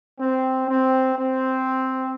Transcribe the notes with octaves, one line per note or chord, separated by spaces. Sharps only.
C4
C4
C4